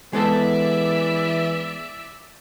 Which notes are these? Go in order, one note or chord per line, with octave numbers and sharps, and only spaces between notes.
E3 G#3 B3 A4 D5 E5